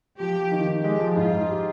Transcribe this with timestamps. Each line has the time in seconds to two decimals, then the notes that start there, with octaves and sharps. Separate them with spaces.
0.19 F3 G4
0.36 F3
0.52 D#3
0.67 D#3
0.83 G#3 G4
1.00 F3
1.16 G#2 F4
1.32 G#2
1.49 G4